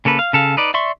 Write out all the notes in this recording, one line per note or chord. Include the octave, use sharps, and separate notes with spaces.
C#3 A#3 A4 B4
F5
C#3 A4 F5
D#4 B4 D5
D5 E5 C6 C#6